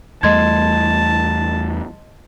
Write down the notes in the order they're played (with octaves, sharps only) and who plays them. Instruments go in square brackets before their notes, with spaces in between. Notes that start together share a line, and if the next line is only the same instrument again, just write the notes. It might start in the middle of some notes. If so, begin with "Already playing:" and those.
[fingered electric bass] E2 G3 A3 [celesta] D#5 C6 G#6 [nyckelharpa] A5